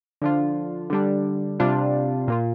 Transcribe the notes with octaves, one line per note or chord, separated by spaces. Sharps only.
D3 F3 D4 F4
D3 G3 D4
C3 G3 D4 F4
A#2 A#3 F4